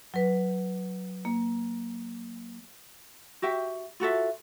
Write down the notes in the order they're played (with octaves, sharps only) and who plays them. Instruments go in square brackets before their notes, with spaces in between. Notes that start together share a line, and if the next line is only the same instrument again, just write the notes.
[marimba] F#3 B4
A#3
[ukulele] F#4 G4 E5 G5
F4 F#4 A4 E5